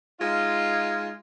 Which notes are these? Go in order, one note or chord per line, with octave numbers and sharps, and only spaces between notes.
G#3 D#4 F4